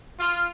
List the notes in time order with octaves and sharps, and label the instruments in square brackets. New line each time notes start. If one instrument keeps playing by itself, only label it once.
[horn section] F4